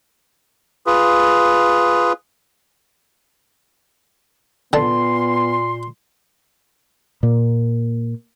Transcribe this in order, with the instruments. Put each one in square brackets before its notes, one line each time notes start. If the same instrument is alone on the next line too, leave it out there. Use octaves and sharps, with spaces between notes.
[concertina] F4 G#4 B4
[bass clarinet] A#2 [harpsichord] D3 A5 [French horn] B3 [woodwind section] C6
[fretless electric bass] A#2 A#3